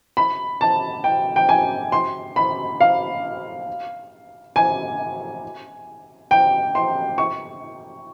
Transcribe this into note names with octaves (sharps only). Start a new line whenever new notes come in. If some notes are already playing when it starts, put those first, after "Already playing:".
B5
A5
G5
G5
G#5
C6
B5
F5
G#5
G5
C6
C#6